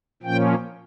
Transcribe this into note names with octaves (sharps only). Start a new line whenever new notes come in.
A#2 F3 A#3 C#4 G5